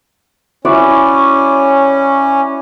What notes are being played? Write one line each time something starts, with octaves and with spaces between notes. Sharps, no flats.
C#4 E4 F#4 D5